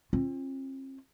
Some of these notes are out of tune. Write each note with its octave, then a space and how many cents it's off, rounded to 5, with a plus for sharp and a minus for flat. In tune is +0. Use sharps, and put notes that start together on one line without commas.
C4 +45 F4 -20